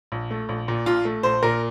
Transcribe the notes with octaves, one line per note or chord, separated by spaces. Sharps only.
A#1
A3
A#1
A#2
A#1 F4
A3
A#1 C5
A#2 A#4